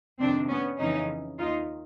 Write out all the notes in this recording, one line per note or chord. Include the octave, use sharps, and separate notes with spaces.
F2 C3 D#3 C4 D4
B3 C#4
F2 C#3 E3 C#4 D#4
D#2 D#3 D#4 F4